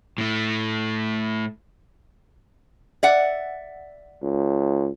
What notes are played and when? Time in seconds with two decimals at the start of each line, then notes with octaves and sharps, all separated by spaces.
0.18 A2 A3
3.03 D5 E5 F#5
4.22 C#2